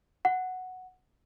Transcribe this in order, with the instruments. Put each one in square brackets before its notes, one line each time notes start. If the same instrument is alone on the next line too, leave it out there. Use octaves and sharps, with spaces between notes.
[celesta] F#5